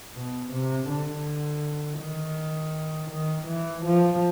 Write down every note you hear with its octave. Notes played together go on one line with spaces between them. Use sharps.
B2
C3
D3
D#3
D#3
E3
F3